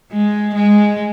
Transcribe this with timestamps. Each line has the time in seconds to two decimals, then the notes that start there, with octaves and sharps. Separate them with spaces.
0.12 G#3
0.55 G#3